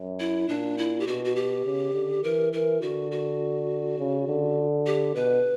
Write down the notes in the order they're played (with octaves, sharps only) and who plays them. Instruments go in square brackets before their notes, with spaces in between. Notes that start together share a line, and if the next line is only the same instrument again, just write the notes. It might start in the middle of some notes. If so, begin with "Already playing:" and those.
Already playing: [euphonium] F#2
[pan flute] E4
[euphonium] A#2 [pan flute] D4
[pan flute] E4
G4
[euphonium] B2 [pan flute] F#4
[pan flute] F#4
G4
[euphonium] C#3
D3
[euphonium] E3 [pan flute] A#4
[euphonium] E3 [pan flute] A#4
[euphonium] D3 [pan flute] F#4
[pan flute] F#4
[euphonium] C#3
D3
[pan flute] G4
[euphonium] B2 [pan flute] B4